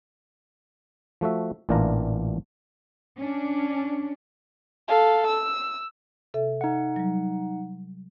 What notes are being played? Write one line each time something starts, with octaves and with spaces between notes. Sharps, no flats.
F3 A3 F#4 E5
A1 A#2 E3 D4 F4 A#5
C#4 D4
A4 F5
E6
C3 A4 E5
D#4 F#5
F#3 G3